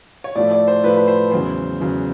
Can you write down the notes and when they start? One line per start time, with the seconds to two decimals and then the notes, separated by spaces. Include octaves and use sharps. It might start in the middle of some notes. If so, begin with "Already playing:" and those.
0.24 C#5
0.36 A2 F3 A3 D5
0.51 D5
0.68 C5
0.84 A2 F3 A3 B4
0.96 B4
1.08 C5
1.32 E2 C#3 F#3 C5
1.81 E2 C#3 F#3